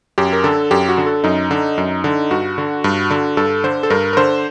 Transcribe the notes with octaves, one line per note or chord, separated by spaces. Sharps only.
F#2 G4
A#4
D3 A4
F#2 G4
F#4
D3
A4
F#2 D#4
D3
F#2
D3
G2 F#4
D3
G2
D3
G2 A4
D3 C5
A4
G2 A#4
A#4
D3 C5